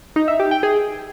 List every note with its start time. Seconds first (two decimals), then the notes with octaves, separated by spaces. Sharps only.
0.16 D#4
0.28 E5
0.40 G4
0.51 G5
0.63 G#4